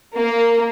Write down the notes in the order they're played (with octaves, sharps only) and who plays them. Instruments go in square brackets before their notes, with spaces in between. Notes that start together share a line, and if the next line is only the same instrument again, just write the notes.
[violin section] A#3